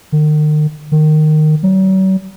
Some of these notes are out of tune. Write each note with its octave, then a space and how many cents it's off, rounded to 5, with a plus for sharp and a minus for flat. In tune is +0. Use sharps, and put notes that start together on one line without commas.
D#3 -40
D#3 -15
F#3 +45